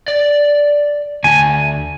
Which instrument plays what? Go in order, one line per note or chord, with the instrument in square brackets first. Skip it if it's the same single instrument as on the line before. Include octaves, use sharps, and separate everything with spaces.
[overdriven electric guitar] D5
[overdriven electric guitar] D2 A5 [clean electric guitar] G#5